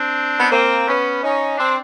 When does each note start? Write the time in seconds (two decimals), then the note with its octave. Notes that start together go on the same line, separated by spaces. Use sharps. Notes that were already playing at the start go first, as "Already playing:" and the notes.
Already playing: C4 D4
0.40 B3
0.51 A#3 C4
0.87 B3 C#4
1.23 C#4 D#4
1.57 C4 D4